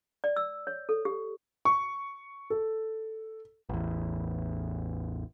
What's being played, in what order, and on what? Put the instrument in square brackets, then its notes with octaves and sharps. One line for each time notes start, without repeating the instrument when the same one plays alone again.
[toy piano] D5
E6
C#5
A4
G4
[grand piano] C#6
A4
[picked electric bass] A1 E2